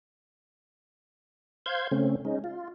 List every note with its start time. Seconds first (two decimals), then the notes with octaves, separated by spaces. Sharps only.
1.66 C5 F5 G6 G#6
1.91 C#3 A3 C4 C#4
2.25 G#3 C#4 D#4
2.44 F4